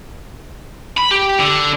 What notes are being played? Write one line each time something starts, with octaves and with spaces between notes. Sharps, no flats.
B5
G4
D3